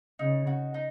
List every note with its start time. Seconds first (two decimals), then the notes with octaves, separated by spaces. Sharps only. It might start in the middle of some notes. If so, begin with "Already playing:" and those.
0.19 C#3 D#4
0.47 F#4
0.74 D#4